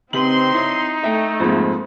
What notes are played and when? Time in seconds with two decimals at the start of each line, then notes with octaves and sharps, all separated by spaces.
0.13 C#3 C4 D#4 G4 B4 C6 F#7
0.54 E4 C#5
1.04 A3 E5 G5
1.40 F2 G#2 A#3 C5